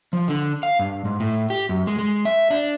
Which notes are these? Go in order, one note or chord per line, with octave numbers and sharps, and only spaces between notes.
F3
D3
F5
G2
G#2
A2
G4
F#2
G#3
G#3
E5
D4